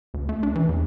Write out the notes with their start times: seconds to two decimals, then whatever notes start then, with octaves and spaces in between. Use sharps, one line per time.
0.14 D2
0.29 A3
0.43 D4
0.55 E3
0.69 E2